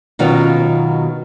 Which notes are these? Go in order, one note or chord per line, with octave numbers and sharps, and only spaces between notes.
B2 D#3 F#3 B3 C#4 F4